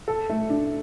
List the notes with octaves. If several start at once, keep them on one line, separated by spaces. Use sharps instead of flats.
A4
A3
D4